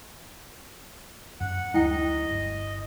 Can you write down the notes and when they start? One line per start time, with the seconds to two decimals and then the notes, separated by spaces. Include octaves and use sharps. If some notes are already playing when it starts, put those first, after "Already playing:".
1.40 F#2 F#5
1.74 D2 F#3 G#3 E4 D#5 G5
2.29 G1